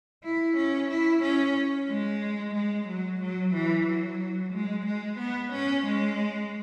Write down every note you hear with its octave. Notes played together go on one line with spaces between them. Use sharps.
E4
C#4
E4
C#4
G#3
G#3
F#3
F#3
E3
F#3
G#3
G#3
B3
C#4
G#3